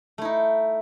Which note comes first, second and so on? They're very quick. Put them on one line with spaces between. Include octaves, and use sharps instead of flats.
A3 E4 D#4